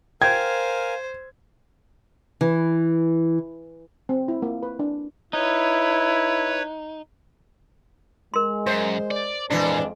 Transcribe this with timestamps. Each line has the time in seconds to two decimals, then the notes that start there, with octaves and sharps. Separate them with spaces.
0.22 A#4 C5 F5 G5 G#5 G#6
2.41 E3
4.09 C4
4.28 E4
4.42 A#3
4.63 B4
4.79 D4
5.33 D#4 E4 B4 C#5
8.34 G#3 A#4 C6
8.67 F#2 C5
9.11 D5
9.50 F2 A#2 E3 G#3 D4